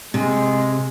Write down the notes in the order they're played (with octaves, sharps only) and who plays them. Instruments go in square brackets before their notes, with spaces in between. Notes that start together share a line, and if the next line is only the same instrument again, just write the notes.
[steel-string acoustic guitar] C3 [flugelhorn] G#3